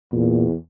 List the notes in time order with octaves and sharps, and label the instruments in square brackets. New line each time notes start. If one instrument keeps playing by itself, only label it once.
[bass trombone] E2 [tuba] A#2